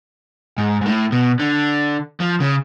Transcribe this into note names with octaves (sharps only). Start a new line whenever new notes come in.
G#2
G#2
A2
B2
D3
F3
C#3